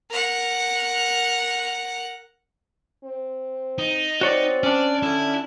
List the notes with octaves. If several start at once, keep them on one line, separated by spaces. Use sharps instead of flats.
A#4 F#5
C4
D#4
C4 F#4 C#5 D5
C#4 D4 D5
D3 E4